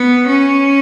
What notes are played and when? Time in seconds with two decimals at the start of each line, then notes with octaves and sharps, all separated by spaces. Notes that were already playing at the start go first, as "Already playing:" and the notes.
Already playing: B3
0.27 C#4